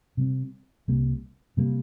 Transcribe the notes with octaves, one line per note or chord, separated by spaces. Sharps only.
C3 G3 C4
C2 C3 G3 A#3
C3 G3 A#3